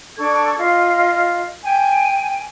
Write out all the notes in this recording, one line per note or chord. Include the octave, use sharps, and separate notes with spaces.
D4 A4 C#6 G#6
F4 D#5
G5 G#5